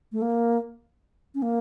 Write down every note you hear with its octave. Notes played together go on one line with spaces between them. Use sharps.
A3
A#3
C#4
A#3